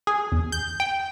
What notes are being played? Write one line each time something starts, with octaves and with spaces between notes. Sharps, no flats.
G#4
E2
G6
G5